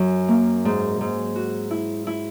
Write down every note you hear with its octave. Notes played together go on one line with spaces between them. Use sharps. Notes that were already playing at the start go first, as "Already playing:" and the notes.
Already playing: F#2
A#3
G#2
G#2
F#4
E4
E4